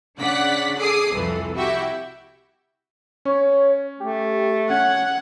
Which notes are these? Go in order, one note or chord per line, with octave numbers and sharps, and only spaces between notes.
C#3 D4 D5 F#5 F#6 B6
G#4 A4 D6 D#6 C7
C2 F2 E3 A4
E4 F#4 G4 E5 G5
C#4 C#5
A3 G4
C#4 F#5 G#6